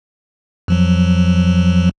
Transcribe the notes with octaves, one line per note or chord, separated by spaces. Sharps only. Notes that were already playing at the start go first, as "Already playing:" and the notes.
F2 F3 F#3